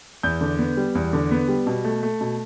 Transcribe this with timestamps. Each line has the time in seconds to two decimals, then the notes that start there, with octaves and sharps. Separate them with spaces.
0.23 E2 G6
0.41 D3
0.59 B3
0.77 G3
0.95 E2
1.13 D3
1.31 B3
1.48 G3
1.67 B2
1.84 A3
2.03 A3
2.21 B2